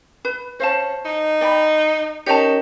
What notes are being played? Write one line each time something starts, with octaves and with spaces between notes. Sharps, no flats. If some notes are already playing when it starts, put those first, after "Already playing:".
B4
C#4 C5 F5 A5
D#4
D5 G5 B5
C#4 D#4 G4 A#4 C#5 G5 A5